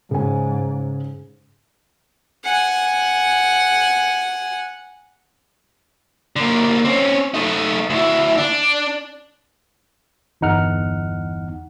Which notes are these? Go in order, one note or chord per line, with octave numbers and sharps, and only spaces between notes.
G#2 C#3 G#5
F#5 G#5
D3 A#3
C4 C#4
A3 D#4
D2 E4
D4
G1 E2 D#4 F#5 F6